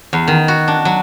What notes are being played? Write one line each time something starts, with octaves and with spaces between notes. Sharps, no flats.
E2
D#3
F#4
D4
F#3